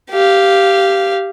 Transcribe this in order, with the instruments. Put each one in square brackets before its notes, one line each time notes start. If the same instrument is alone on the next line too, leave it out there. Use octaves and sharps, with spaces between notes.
[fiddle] G4 F5